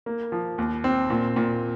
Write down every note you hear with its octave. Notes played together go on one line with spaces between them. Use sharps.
A#3
F3
D#2
C4
A#2
A#2